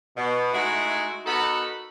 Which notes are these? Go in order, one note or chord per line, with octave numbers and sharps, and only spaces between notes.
B2
G#3 A3 D#4 E4 F#4
B3 D#4 F#4 A4 A#4 B5